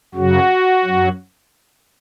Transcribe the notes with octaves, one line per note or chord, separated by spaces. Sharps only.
F#2 C#3 F#3 F#4
F#2 F#3